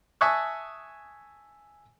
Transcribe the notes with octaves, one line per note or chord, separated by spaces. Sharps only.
E5 G#5 A5 C#6 D#6 F#6